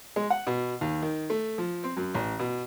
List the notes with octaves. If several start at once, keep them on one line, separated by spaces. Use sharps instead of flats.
G#3
F#5
B2
D#2
D#3
A3
F3
C4
F#2
A1
B2